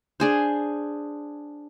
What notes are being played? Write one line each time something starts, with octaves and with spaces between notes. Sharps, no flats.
D4 G#4 C5